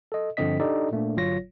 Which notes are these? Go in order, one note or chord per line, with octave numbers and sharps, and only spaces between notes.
A4 D#5
G2 D3 F3 C4 D#5 B6
D4 D#4 G4 A4 D5 D#5
A#2 A3 A#3 D4
G1 F#3 F4 C#5 A#6